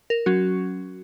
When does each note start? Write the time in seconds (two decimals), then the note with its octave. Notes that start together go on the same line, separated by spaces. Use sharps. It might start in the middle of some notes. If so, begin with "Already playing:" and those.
0.10 A#4
0.26 F#3 C#4 F#4